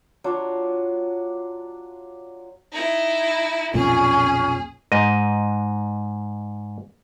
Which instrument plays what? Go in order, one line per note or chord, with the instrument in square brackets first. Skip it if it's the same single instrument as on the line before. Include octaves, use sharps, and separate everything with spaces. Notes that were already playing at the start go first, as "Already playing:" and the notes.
[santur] F#3 D4 F4
[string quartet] D#4 E4
[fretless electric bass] B1 F2 A#2 [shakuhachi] C#4 [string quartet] G#4
[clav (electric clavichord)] G#2 D#5